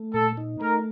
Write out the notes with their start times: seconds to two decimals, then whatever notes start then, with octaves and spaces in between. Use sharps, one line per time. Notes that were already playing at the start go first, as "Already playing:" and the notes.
Already playing: A3
0.14 A#2 A4
0.37 D#4
0.61 A3 A#4